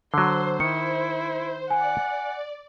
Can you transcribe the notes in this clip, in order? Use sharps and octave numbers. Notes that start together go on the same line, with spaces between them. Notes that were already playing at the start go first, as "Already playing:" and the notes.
D3 F#3 C5 C6
D#3 E4 C#7
D5 F#5 G#5